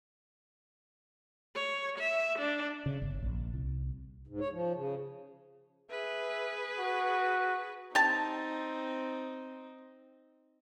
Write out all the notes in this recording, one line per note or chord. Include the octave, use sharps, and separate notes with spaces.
C#5
E5
D4
C#3
G1
A#1
C2
G#2
C#5
F3
C#3
G#4 B4 E5
F#4
C4 D#4 G4 A5